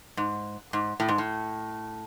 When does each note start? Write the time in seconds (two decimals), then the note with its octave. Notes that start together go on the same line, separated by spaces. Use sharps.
0.17 G#2
0.73 G#2
1.00 A2
1.09 G#2
1.18 A2